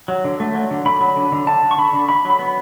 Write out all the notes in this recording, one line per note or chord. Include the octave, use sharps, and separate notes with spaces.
F#3
D3
A3
F#3
D3
D3 B5
F#3
D3
D3
D3 A5
D3
C#6
D3 B5
D3
D3 B5
F#3
B5
B3